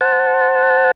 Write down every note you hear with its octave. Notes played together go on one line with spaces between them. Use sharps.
C5 F#5 A5